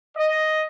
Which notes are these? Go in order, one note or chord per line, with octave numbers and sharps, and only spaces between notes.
D#5